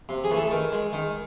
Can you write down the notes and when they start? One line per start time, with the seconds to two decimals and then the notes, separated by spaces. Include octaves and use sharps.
0.09 C3
0.24 G#4
0.30 E3 A3
0.37 A4
0.51 D#3
0.72 G#3
0.93 D#3